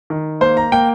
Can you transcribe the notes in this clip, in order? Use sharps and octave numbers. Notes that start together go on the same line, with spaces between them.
D#3
A#3 C5
A#5
A#3 G5